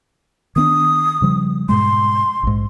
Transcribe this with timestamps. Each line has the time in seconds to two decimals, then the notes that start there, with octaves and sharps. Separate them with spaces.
0.56 D#3 B3 D4 D#6
1.22 C#3 F3 G3
1.69 G#2 B2 G#3 C6
2.43 A#1 G#2